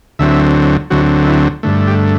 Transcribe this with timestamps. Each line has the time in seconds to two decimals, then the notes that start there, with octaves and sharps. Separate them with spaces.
0.19 D2 D3 F#3 C4 E5
0.90 D2 D3 F#3 C4 F#4
1.27 E4
1.63 G2 D3 A3
1.87 G4